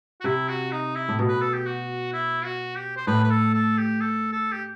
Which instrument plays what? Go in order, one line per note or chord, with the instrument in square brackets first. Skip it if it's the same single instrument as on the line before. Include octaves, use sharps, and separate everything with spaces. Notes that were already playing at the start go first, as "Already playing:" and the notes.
[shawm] F#4
[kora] C3 [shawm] E4
[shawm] F#4
D#4
E4
[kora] A2
B2
[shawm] B4
A4
G4
F#4
E4
F#4
G4
C5
[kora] A2 [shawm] B4
[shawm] B4
A4
A4
G4
A4
A4
G4